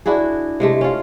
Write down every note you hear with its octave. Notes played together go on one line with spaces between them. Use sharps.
D4 E4 F#4 G#4
C3 G#3 A3
C#4 F4